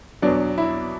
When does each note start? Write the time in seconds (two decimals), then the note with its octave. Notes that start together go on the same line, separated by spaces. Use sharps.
0.22 E2 B2 F#3 D4
0.58 E4